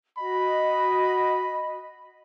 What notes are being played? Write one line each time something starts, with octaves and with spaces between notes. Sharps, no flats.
F#4 D#5 B5